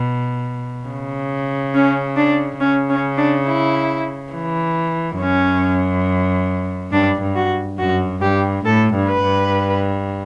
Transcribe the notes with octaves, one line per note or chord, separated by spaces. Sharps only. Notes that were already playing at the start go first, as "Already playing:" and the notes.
Already playing: B2
C#3
C#4
D4
C#3 C#4
C#4
D4
E4
E3
F#2 C#4
G2 D4
G2
F#4
F#2 F#4
G2 G4
A2 A4
G2
B4
G2